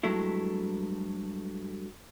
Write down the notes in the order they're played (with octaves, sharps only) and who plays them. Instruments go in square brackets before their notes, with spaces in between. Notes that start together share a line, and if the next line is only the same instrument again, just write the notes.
[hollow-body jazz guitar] G2 F#3 G#3 A3 E4